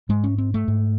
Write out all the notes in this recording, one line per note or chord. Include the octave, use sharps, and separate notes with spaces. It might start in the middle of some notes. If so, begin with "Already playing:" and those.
G#2 G#3
C#4
C4
A3
G#2